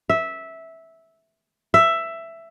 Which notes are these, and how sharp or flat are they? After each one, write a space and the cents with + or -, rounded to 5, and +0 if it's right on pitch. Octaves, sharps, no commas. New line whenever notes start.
E5 -10
E5 +10